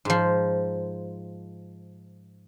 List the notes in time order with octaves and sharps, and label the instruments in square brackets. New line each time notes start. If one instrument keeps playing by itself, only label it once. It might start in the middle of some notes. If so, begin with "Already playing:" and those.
[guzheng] G#2 F3